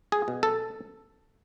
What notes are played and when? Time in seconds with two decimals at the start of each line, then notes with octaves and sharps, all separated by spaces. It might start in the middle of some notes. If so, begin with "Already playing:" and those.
0.12 G#4
0.28 B2
0.43 A4